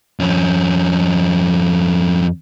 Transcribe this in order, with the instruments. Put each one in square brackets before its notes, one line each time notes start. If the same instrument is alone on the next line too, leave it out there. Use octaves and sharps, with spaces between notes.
[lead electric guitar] F2 C#4